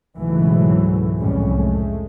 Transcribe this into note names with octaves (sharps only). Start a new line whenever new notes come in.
C#2 G#2 B2 E3 F#3 A3
C2 F2 A2 G3 G#3 C#4
G#3 A3